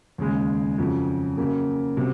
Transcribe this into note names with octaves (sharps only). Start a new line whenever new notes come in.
D#2 C#3 G#3
F2 C#3 F#3
C#3 F#3 A#3
C3 F#3